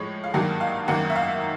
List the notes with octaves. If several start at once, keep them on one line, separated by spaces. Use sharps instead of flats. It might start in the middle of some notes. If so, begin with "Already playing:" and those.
Already playing: A2 F3 G#3 C#5
F5
G2 D#3 F#3 A#3 F#5
F5
F#2 D#3 F#3 A#3 F#5
E5
F5